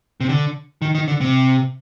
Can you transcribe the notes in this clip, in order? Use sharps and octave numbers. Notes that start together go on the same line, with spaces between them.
C3
D3
D#3
D#3
D3
C3